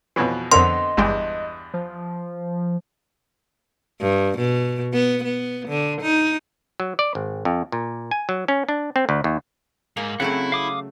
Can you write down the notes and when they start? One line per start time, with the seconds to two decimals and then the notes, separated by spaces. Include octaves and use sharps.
0.16 F2 B2 E3 B4 C#5
0.52 F2 D3 B3 C4 A#4 D#5 C6
0.97 G1 E2 G2 G#3 G5
1.74 F3
4.01 G2
4.38 B2
4.93 B3
5.24 B3
5.69 D3
6.02 D#4
6.80 F#3
6.99 D5
7.15 G#1
7.45 F2
7.72 A#2
8.11 G#5
8.29 F#3
8.48 C#4
8.69 D4
8.96 C4
9.09 D2
9.24 D#2
9.97 G#2 A#3
10.20 C#3 F#3 A3 C4 E4 F#5
10.52 F5 D6 D#6